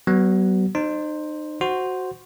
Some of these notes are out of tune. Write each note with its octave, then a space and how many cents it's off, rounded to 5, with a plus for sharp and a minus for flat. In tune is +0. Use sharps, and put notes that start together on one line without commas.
F#3 +40 B3 +0
D#4 -35 C5 +10
F#4 +0 C5 +0